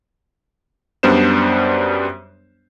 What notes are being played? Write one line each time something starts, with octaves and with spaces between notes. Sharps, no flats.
F#2 G3 B3 D4 C5 E7